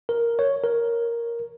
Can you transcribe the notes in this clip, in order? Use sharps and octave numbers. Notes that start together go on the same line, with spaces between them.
A#4
C#5
A#4